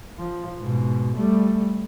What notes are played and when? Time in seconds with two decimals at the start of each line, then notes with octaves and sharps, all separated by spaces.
0.18 F3
0.60 G#2 B2
1.15 G3 A3